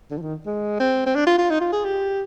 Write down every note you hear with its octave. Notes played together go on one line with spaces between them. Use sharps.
D3
F3
D#3
G#3
C4
C4
D4
F4
F4
D#4
F4
G#4
G4